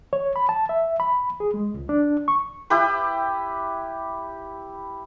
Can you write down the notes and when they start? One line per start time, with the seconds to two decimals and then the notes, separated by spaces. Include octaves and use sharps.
0.13 C#5
0.36 B5
0.49 A5
0.69 E5
1.00 B5
1.40 G#4
1.54 G#3
1.74 C#2
1.89 D4
2.28 C#6
2.70 E4 G4 B4